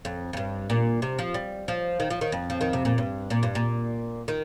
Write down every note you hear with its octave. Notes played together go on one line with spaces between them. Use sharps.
F2
F2
G2
A#2
C3
F3
G3
F3
D#3
F3
D#3
F2
F3
D#3
C3
A#2
G2
A#2
G2
A#2
D#3